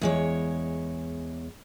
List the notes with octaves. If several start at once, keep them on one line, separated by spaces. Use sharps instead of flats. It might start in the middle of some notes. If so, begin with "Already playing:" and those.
E2 G#3 C#5